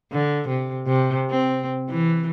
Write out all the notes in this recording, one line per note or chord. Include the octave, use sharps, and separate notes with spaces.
D3
C3
C3
C4
E3